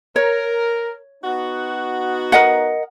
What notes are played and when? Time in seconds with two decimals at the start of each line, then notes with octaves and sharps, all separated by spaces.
0.16 A#4 C#5
1.24 B3 D#4 F#4
2.32 A#4 D#5 F#5